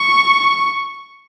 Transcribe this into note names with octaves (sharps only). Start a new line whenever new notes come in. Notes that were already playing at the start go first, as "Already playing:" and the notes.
Already playing: C#6